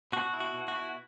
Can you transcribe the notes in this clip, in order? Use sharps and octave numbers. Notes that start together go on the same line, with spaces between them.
B2 F#4
E4
F#4
B2
F#4
E4